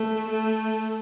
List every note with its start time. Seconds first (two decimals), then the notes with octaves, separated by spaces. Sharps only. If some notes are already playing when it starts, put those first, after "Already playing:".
Already playing: A3
0.30 A3